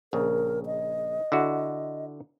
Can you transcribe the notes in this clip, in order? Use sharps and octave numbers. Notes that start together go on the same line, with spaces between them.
A#1 C#3 A#4
D#5
D3 E4 F#4